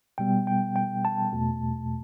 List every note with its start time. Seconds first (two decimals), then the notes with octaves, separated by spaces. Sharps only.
0.18 B2 G3 B3 G5
0.47 G5
0.76 G5
1.05 A5
1.33 E2 B2 A3